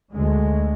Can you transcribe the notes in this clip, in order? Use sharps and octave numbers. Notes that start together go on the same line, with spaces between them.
D2 D3 G#3